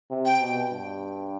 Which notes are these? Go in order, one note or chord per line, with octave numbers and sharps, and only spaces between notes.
C3
G5
B2
G2